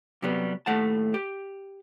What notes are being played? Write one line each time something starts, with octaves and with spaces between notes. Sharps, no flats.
C3 F#3 G3 B3
D#2 A2 A3 F#5 A5
G4